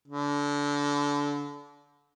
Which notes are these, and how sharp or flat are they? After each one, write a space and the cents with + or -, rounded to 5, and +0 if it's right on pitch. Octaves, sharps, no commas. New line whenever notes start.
D3 -25